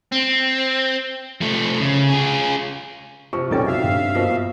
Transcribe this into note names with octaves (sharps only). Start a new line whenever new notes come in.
C4
F3 A3
C#3
F4 G#4
C3 F3 C#6
B1 D#3 C#4 D#4 A4 D5 G5
F#4 E5 F5
G2 A#2
B2 F3 A#3